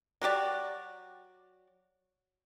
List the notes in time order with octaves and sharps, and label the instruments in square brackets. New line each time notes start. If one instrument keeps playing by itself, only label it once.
[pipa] F#3 F#4 G4 D5